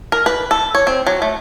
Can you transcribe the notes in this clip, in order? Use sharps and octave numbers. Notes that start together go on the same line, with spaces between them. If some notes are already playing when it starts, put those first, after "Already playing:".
A#4
B4
A4
C#5
C4
F#3
A3